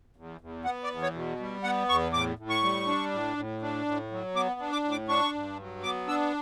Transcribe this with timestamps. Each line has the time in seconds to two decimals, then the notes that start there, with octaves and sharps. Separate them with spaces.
0.16 E2
0.41 E2
0.65 B3 F#5
0.84 D5
0.90 E2
1.02 C#5
1.14 B2
1.40 G3
1.64 B3 F#5
1.89 E2 C#6
2.13 A2 D6
2.38 A2
2.50 C#6
2.63 G3
2.87 D4
3.12 A2
3.37 A2
3.62 D4
3.86 A2
4.11 F#3
4.35 B3 D6
4.60 D4
4.72 D6
4.84 A2
4.91 D6
5.09 D4 C#6
5.34 G2
5.59 F#3
5.83 B3 D6
6.07 D4 E6